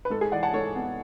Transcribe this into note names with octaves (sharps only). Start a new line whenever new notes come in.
B4
G#2 A4
G#4
E3 D5 F#5
F#5 A5
G#2 A4 C#5
B3